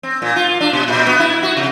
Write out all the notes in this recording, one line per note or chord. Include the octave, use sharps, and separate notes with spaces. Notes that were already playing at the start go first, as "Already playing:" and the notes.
C4
A#2
F4
D4
B2
A#2
B3
E4
F#4
C3